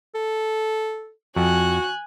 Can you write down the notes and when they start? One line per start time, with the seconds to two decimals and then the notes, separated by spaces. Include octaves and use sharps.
0.15 A4
1.36 F2 F#4 G#5 F#6